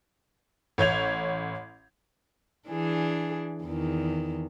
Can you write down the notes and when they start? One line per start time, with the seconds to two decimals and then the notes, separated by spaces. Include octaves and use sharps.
0.78 A1 C#5 G6 G#6 F7
2.68 E3 D4 G#4
3.64 E2 D#3